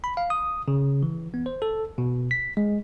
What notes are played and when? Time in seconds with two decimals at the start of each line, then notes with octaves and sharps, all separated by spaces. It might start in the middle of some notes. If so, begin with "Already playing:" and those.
0.04 B5
0.17 F5
0.30 D#6
0.68 C#3
1.03 E3
1.34 B3
1.46 C5
1.62 A4
1.98 B2
2.31 B6
2.57 G#3